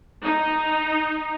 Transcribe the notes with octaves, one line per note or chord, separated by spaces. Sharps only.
D#4